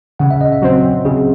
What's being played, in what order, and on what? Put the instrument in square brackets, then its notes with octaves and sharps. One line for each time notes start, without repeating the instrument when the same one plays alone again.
[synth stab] C#3 [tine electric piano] F#5
[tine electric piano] E5
D#5
E5
[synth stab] F#3 C4
[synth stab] C#3 [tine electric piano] G#4